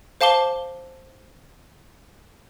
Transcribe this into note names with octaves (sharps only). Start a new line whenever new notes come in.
C5 F5 A5 D6 G7